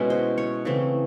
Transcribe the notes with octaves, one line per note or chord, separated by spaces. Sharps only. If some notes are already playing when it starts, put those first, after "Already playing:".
Already playing: B2 G#3 C#4 E4
C5
C#5
C#3 E3 A3 C4